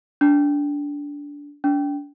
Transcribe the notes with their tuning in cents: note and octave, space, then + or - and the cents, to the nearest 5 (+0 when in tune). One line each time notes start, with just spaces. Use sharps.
D4 -20
D4 -35